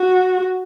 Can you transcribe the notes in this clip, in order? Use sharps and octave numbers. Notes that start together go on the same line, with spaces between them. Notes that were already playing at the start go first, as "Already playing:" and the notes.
Already playing: F#4